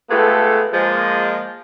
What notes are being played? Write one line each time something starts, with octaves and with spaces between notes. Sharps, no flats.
G#3 A3 B3 F4 G4 A4
F3 G#3 A#3